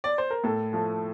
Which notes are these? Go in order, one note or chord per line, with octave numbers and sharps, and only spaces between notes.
D5
C5
A#4
A2 A4
F3 A3